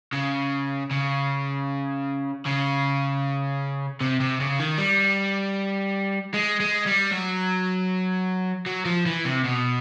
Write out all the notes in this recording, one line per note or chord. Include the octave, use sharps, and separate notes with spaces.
C#3
C#3
C#3
C3
C3
C#3
D#3
G3
G#3
G#3
G3
F#3
F#3
F3
E3
C3
B2